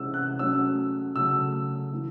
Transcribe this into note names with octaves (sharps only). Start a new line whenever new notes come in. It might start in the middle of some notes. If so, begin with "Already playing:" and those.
Already playing: C3 E3 G#3 C#4 E6
F#6
F#3 A3 C#4 E6
C#3 F#3 A3 E6
E3 A3